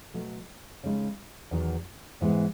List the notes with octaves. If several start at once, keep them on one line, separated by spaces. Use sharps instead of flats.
B2 F#3 A3
C#3 G#3 D#4
E2 D#3 F#3
G#2 E3 G#3 B3